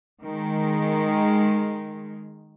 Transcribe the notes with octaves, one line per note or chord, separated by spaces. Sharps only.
D#3 G#3